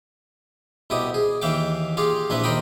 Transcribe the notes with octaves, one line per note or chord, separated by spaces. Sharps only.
C2 B2 E4 G4 D#6
G#4
D#2 E3 E5 F5 G5 D6
F4 G4 G#4 F5
A#1 F3 C4 E4 B4
D#2 A#4 C5 G5 B5 D#6